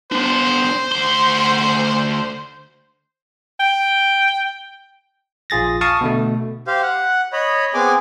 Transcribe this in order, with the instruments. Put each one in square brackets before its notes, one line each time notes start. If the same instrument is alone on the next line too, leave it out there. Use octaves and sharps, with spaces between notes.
[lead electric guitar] B3 D4 [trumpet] C5
[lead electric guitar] D2 C6
[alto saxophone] G5
[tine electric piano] A#1 F4 G#4 A6 A#6
F5 A5 C#6 D#6
B2 D3 A3
[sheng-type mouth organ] G4 C5 F5
F#5
C#5 D#5 B5
B3 C4 G#4 G#5 D6